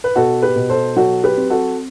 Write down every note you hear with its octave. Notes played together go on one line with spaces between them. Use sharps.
B4
B2 F#4 A4
G4 B4
B2
A4 C5
F#3 F#4 A4
G4 B4
C4
F#4 A4